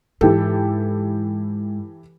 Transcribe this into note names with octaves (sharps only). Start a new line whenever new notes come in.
G#2 E3 G4 A4